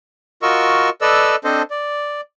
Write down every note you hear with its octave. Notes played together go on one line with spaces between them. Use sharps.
F4 F#4 A#4 D#5 C#6 E6
A4 B4 D5 D#5 E6
C4 D4 A4 C5 D#5
D5